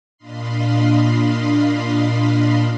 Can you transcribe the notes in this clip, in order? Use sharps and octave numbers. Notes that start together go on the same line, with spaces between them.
A#2 D4 D#5 F5 B5 C6